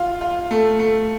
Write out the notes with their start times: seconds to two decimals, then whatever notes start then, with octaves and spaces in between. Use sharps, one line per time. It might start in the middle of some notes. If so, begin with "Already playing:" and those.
Already playing: F4
0.21 F4
0.51 A3
0.79 A3